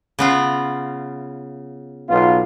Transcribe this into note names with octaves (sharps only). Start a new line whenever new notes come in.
C#3 B3 F4
B1 B3 F4